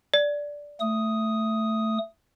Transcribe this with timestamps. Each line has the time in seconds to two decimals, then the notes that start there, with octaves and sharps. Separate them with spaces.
0.14 D5
0.80 A3 D#6